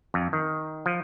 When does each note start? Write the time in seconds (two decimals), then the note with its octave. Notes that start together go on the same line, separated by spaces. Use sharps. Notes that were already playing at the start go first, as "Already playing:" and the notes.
0.14 F2
0.33 D#3
0.86 F3